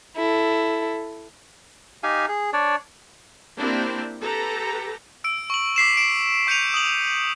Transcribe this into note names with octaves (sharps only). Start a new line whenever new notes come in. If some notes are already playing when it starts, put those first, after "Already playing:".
E4 A4
D#4 G4 F5 G#5
G#4
D4 C#5 D5
A#3 C4 D4 E4 G4
G4 A4 B4 A#5
E6 D7
C#6 F#7
D6 B6 C7 E7
C7 D7 E7
C#6 G6 C7 C#7 D#7 F7
D#6 F#7